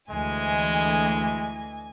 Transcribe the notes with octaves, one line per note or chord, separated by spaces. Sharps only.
D2 E3 G#3 D#5 G#5